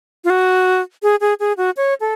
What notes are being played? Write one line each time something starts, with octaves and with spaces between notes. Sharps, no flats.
F4
F#4
G#4
G#4
G#4
F#4
C#5
A4